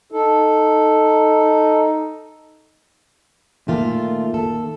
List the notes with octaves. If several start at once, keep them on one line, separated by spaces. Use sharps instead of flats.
D#4 A4
A#2 D#3 A3 A#3 F4
A4